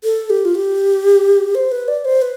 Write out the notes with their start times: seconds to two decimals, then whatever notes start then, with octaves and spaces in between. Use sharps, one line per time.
0.04 A4
0.30 G4
0.45 F4
0.55 G4
1.55 C5
1.72 B4
1.88 D5
2.05 C5
2.22 B4